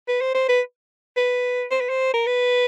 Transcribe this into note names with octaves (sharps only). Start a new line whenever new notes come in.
B4
C5
C5
B4
B4
C5
B4
C5
A#4
B4